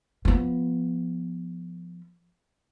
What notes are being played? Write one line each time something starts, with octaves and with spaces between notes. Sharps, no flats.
F3 B3